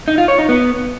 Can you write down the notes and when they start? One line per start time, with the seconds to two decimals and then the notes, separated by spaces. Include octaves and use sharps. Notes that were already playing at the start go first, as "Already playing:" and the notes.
0.08 D#4
0.18 F4
0.28 C#5
0.38 D#4
0.49 B3